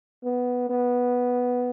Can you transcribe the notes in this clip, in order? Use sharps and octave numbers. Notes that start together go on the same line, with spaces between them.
B3
B3